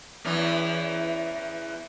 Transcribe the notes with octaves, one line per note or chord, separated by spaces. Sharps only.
E2 E3 C#4